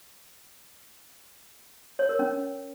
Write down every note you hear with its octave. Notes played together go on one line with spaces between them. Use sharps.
C#5
A#4
C#4